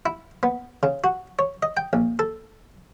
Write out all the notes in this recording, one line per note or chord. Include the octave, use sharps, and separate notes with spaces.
E4
B3
C#3
F#4
C#5
D#5
G5
A#1
A4